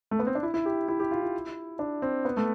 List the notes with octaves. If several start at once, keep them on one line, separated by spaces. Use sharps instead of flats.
A3
B3
C4
D4
E4
E4
G4
E4
G4
F4
E4
D4
C4
B3
A3